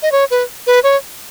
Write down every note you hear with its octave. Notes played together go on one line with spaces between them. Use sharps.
D#5
C#5
B4
B4
C#5